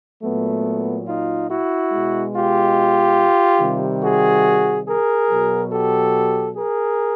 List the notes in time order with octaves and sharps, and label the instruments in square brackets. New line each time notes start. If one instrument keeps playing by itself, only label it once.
[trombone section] A#2 F#3 A3 B3
D#4 F4
E4 F#4
B2 G#3
F4 G4
C3 D#3 G3
F#4 G#4
G#4 A#4
B2 F#3
G4 A4
G#4 A#4